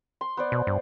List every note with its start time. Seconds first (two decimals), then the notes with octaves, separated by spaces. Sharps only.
0.21 C6
0.37 B3 C5 D5
0.52 B2
0.67 G2